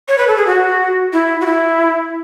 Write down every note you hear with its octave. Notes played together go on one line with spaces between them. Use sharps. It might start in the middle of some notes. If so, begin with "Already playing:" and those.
C#5
B4
A4
G#4
F#4
E4
F#4
E4